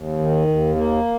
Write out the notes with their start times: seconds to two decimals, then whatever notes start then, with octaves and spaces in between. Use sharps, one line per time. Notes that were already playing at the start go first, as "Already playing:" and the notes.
Already playing: D#2
0.19 D#3
0.47 D#2
0.75 A#3